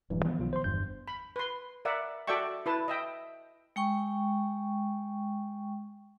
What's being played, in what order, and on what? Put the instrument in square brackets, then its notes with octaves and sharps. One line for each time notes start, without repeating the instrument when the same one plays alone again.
[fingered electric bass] D#1 G2 F#3 [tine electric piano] E3
[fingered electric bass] D#3 F3 B3
[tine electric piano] B1 F4
C5 C6
[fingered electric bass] G1 [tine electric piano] E2 G2 G6
[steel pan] B5
B4 C6
A#4 D5 E5 F#5
F#4 A4 D5 E5 G5 C#6
E4 B4 A5
D#5 E5 G5
[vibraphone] G#3 G5 C#6